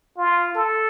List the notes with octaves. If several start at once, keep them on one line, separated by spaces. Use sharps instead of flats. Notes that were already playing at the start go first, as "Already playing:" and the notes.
F4
A4